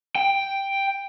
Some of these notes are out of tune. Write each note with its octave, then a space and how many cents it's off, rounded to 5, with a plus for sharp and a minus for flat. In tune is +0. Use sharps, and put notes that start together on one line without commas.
G5 +5